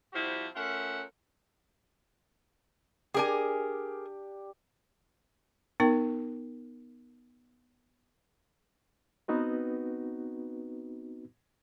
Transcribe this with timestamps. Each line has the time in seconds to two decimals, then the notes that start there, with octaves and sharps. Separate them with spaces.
0.13 F3 G3 C4 E4 F#4 G4
0.55 A3 C#4 F4 A#4 E5 F#5
3.14 D4 G4 G#4 A#4 G#5
5.80 B3 D#4 A#4 G5
9.28 B3 C4 D#4 F#4 B4